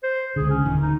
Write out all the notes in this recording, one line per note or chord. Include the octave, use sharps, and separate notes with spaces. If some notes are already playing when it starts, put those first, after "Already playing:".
C5
C#2 D3 G#4
C#4
D1 D2 D#3
D#4